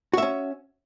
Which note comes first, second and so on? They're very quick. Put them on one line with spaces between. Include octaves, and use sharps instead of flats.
F#4 E5 C#4